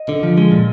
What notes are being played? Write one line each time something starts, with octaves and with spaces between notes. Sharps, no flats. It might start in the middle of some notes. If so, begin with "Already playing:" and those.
Already playing: D#5
D3
F3
G#3
A#2